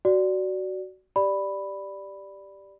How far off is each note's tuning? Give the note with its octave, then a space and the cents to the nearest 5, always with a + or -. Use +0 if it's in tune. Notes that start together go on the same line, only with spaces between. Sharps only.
F#4 +15 D5 -5
G4 +0 D5 +0 B5 +0